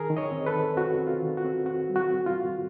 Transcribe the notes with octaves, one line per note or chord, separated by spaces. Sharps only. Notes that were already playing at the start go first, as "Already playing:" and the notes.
Already playing: D#3 G#4 A#4
D#3
C#5 D#5
C4
A4 B4
D#3
C4 F#4
C4
F4
D#3
F#4
C4
C4 F#4
G3
F#4
C4
F4
D#3